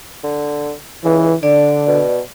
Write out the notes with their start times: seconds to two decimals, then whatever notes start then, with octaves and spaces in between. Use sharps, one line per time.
0.23 D3
1.04 C#2 E3
1.43 D3 D4 D5
1.87 B2